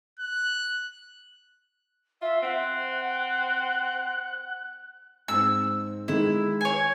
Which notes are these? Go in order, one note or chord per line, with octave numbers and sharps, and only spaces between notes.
F#6
F4 E5
C4 F#5 F#6
G#2 C4 E6
D#3 G#3 E4
C#5 G#5